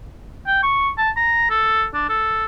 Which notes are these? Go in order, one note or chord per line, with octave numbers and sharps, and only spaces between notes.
G5
C#6
A5
A#5
A4
D4
A4